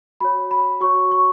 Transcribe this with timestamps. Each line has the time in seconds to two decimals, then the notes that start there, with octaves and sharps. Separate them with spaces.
0.20 F#4 C#5 B5
0.51 B5
0.81 F#4 C#5 C#6
1.11 C#6